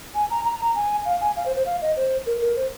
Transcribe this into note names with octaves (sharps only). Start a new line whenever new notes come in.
G#5
A#5
A#5
A#5
G#5
F5
G#5
F5
C5
C5
F5
D#5
C5
A#4
A#4
C5